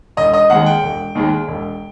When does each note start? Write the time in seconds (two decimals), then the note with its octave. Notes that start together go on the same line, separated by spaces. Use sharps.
0.17 E1 D#5
0.33 D#5
0.50 D#2 D#3 G#3 F#5
0.66 G5
0.82 E1
1.15 D#2 D#3 G#3
1.48 E1